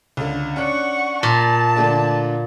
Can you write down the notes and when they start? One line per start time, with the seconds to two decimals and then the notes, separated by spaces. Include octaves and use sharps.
0.17 C#2 D3
0.56 C#4 D4 F#5 C#6 F#6
1.23 A#2 A5
1.76 D3 A3 D4